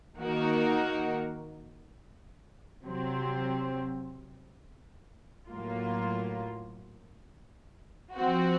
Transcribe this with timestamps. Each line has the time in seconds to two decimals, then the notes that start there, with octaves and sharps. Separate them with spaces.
0.18 D#3 A#3 D#4 F#4 A#4
2.83 C3 F#3 C4
5.49 A2 F#3 A#3 F4
8.15 F3 C4 F#4